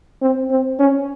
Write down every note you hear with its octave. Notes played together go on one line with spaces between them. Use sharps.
C4
C4
C#4